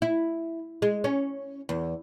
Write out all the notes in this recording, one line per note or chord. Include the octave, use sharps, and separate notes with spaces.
E4
G#3
C#4
E2